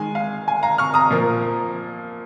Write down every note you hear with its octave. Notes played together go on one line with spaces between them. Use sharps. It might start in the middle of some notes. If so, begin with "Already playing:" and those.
Already playing: D#3 G#3 G#5
F5
G#5
F5 A#5
C#6 F6
A#5 D#6
A#2 F3 A#3